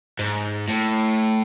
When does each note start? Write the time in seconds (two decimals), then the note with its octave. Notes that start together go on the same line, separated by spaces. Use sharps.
0.19 G#2
0.69 A2